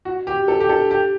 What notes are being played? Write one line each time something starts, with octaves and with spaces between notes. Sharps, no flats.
F#4
G4
A4
G4
A4
G4